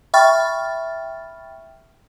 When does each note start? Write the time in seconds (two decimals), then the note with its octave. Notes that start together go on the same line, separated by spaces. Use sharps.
0.14 E5 G5 B5 C#6 F6 A6